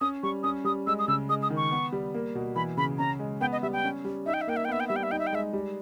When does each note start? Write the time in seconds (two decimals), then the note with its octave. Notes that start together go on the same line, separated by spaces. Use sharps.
0.01 C#4 D#6
0.23 G3 C#6
0.43 C#4 D#6
0.65 G3 D#6
0.87 G#3 E6
0.99 D#6
1.08 C#3 E6
1.29 G#3 D#6
1.43 D#6
1.50 D#3
1.57 C#6
1.71 B3
1.92 G3
2.14 A#3
2.35 B2
2.56 E3 B5
2.77 C#3 B5
2.98 C#4 A#5
3.19 G#3
3.41 B3 G5
3.52 D#5
3.62 G3 E5
3.73 G5
3.84 C#4
4.05 G3
4.26 D#4 E5
4.34 G5
4.41 E5
4.48 A#3 G5
4.56 E5
4.65 G5
4.69 B3 E5
4.80 G5
4.87 G3 E5
4.96 G5
5.03 E5
5.11 D#4 G5
5.19 E5
5.27 G5
5.33 G#3 E5
5.53 G3